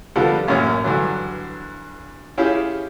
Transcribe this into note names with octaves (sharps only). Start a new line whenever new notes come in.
D3 F3 G3 B3 F4 A4
A1 F#2 A#2 C#5
G2 D3 E3 F#3
C#4 E4 F4 G4 G#4